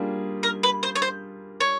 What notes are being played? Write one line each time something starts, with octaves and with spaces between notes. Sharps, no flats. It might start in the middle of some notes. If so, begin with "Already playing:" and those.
Already playing: G3 A#3 D4 F4 G#4
A#4
B4
C5
C#5
C5
C#5